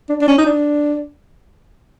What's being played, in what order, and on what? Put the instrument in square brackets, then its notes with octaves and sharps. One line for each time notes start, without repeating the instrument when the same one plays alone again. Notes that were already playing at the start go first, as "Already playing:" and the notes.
[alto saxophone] D4
D4
C#4
D#4
D4